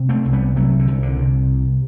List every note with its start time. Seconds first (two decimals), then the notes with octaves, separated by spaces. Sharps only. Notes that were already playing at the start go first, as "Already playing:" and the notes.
Already playing: C3
0.09 A3 C4
0.25 C2
0.33 G3 B3
0.56 C3 F#3 A3
0.79 D3
0.88 C2
1.03 D3
1.18 C3